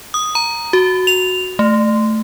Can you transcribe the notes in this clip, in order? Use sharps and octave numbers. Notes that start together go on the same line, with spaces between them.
D#6
A#5
F#4
F7
A3